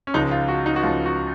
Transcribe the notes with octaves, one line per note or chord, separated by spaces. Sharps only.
C#4
C#2 C#3 F3 G#3 D#4
F4
F#4
D#4
F#4
C#2 C#3 F3 G#3 F4
F#4